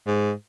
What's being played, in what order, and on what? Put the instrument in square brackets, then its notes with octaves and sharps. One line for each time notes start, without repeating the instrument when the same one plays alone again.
[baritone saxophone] G#2